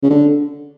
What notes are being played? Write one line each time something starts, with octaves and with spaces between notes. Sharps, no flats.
C#3
D3